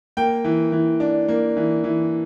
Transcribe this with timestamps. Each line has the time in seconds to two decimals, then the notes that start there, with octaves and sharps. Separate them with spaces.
0.17 A#3 G5
0.44 E3
0.72 E3
1.00 D4
1.28 A#3
1.57 E3
1.84 E3